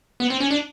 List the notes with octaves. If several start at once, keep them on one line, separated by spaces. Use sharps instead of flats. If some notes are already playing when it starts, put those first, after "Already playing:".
B3
C4
C#4
D4